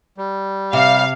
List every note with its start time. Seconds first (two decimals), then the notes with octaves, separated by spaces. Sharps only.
0.18 G3
0.73 C3 F5